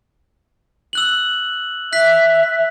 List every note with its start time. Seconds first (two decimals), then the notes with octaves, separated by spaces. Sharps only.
0.93 E6 F#6 F#7
1.93 E5 F#6 B6